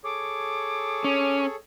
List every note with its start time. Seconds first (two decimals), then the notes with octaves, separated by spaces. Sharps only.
0.04 G#4 A4 C#5 D6
1.04 C#4